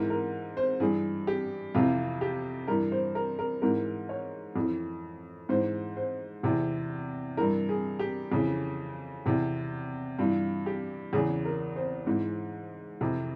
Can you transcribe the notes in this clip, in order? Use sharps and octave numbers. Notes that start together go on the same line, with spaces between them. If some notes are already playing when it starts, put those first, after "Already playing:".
Already playing: G#2 E3 A#4
A#4
C5
G2 E3 G#4
G4
F2 C3 E3 F4
G4
G2 E3 A#4
C5
A#4
A#4
G#2 E3 A#4
C#5
F2 E3
G#2 E3 C5
C5
E2 C3 E3
G2 E3 A#4
G#4
G4
F2 C#3 E3
E2 C3 E3
G2 E3 F4
G4
E2 C#3 E3 G#4
A#4
C5
G#2 E3
F2 C3 E3